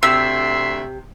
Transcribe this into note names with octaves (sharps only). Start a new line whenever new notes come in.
D2 C3 E5 C6 E6